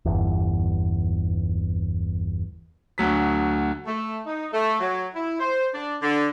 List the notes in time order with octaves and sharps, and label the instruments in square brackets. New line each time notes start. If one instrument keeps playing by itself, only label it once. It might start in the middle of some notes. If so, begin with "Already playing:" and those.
[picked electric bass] G1 E2
[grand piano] D2 F#3 B6
[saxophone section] A3
D#4
A3
F#3
E4
C5
D4
D3